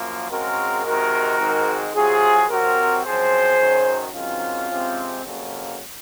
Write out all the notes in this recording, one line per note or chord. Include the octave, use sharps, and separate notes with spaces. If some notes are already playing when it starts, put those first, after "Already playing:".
Already playing: F#2 F3 A#3
C#3 G#3 C4 F#4 A#4
C3 D#3 G#3 F#4 A#4
G#2 D#3 G#3 C4
C3 F#3 C4 F4 G#4
C3 F#3 C4 F#4 A#4
F#2 F3 C4 G#4 C5
F#2 D#3 F#3
G#2 D#3 F#3 C4 C#4 F4
C3 F3 G#3 C4
F2 C#3 F#3 A#3